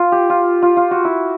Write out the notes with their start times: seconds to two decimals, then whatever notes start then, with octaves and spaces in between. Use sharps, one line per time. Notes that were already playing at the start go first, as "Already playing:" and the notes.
Already playing: F4
0.12 G4
0.30 F4
0.62 F4
0.77 F4
0.91 F#4
1.05 E4